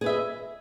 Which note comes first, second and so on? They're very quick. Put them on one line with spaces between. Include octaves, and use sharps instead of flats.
G#4 B4 E5 D#5